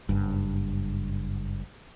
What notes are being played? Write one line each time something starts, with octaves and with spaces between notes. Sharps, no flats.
F#1 G2